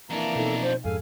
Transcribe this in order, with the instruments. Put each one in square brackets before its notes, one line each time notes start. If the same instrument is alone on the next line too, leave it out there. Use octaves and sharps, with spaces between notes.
[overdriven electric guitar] F2 D4 [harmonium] E3 A#3 A#5
[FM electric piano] B2 D#4 [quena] A4
[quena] C5
[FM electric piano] F2 G#2 [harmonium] C#3 F5 G#5 [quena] A4